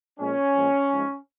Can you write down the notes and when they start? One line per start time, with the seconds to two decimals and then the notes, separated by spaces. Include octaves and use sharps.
0.19 A#2 F3 G#3 C#4
0.56 A#2 F3 G#3
0.92 G#2 F3 G#3